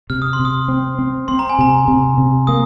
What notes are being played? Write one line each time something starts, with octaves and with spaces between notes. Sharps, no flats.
C3 F6
D#6
C6
C3
D#6
C4
C4
C4 C6
A#5
G#5
C3 A#5
C3
C3
A#3 D#6